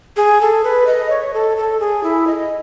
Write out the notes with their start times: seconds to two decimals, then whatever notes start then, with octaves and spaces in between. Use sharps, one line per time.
0.17 G#4
0.41 A4
0.64 B4
0.87 D#5
1.10 C#5
1.34 A4
1.57 A4
1.80 G#4
2.03 E4
2.27 D#5